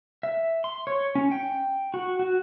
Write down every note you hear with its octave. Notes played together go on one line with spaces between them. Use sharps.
E5
C6
C#5
C#4
G5
F#4
F#4